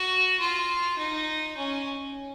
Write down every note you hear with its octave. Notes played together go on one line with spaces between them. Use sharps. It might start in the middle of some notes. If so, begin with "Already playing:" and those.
Already playing: F#4
F4
D#4
C#4